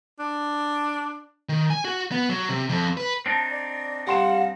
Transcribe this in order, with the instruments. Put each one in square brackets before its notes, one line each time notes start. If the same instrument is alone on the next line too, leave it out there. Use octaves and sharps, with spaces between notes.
[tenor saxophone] D4
[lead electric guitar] D#3
G#5
F#4
B3
F#3
C3
F2
B4
[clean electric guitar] C4 D4 D#4 [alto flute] A5
[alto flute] D5
[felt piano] G3 C6 E7 [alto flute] F5 [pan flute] F#5